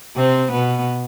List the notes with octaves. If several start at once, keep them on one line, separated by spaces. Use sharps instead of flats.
C3 C4
B2 B3